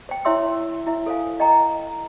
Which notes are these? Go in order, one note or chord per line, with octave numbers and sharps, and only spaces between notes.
C5 G5
E4 C#5 E5 C6 E6
E4 E5
A4 C5 F5 G#5
D#5 G5 A#5